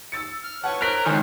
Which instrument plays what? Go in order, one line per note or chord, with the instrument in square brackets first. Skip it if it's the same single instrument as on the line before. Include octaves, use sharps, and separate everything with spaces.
[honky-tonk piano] E6 A6 C#7
[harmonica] F6
[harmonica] B4 C#5 A5 [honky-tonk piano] F#5
[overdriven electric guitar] A#4 [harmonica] C5 C#5 A#5 [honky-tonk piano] F#6 B6 D7
[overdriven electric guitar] C#2 D#3 [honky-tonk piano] G#5